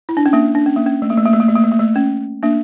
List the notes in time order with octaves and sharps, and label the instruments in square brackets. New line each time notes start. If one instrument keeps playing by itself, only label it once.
[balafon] E4
D4
C#4
A#3 D4
D4
C#4
A#3
C#4
A3
A#3
A3
A#3
A3
A#3
A3
A#3
A3
A#3
A3
C#4
A#3 D4